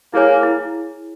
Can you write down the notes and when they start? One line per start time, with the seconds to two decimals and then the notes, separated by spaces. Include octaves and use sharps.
0.14 A#3 E4 G#4 C#5 G#5
0.43 E4